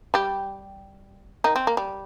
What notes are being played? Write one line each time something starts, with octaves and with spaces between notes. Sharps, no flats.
G3 G4
D#3 D#4
C4
A#3
G3